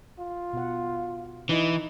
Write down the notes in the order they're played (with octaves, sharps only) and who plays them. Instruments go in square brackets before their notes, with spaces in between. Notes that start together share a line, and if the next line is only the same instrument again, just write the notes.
[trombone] F4
[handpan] B2 F#5
[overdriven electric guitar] E3 [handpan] D#4 E4 D#5